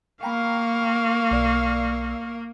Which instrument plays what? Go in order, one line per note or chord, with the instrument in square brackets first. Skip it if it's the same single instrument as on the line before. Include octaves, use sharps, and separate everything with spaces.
[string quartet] A#3 [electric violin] F5 C#6 [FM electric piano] G5 A#5 B5
[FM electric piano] B1 D5 E6